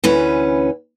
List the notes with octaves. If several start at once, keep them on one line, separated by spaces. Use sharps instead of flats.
D2 E3 C#4 B4